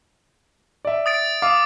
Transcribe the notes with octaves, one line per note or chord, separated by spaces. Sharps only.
D5 E5
D#6 A6 D7
F5 D6 D#6